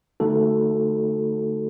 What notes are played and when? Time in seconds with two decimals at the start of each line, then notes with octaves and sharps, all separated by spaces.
0.20 D3 A3 D#4 F#4 A4